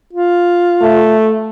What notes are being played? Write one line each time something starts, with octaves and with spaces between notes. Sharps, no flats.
F4
A3